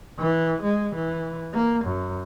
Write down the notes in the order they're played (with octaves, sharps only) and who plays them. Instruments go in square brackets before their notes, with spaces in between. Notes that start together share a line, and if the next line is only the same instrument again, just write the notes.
[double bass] E3
G#3
E3
A#3
F#2